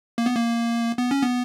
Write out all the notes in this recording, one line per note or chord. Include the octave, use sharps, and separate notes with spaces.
A#3
B3
A#3
B3
C#4
B3